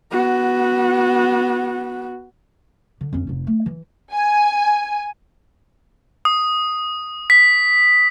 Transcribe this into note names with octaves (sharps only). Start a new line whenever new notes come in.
B3 F#4
D3
F2 C#4
F1 D#4
A3
E3
G#5
D#6
B6